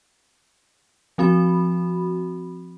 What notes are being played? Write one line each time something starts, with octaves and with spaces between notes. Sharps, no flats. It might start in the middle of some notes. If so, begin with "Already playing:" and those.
F3 C4 F#4 B5